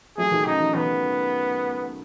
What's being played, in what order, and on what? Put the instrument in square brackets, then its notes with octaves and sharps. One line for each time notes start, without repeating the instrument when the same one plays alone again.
[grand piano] F#3 A3 [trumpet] G#4
[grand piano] D#3 F#3
[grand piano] C#3 [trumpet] D#4
[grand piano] D#3
[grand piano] D#3 [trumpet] B3